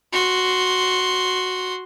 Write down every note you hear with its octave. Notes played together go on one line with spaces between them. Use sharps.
F#4 C6